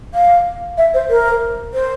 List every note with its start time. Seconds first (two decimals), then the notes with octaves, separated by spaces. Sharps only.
0.14 F5
0.78 E5
0.94 C5
1.10 A#4
1.74 C5